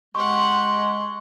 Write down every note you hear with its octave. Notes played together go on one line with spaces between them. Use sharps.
G#3 G4 F#5 C6 C#6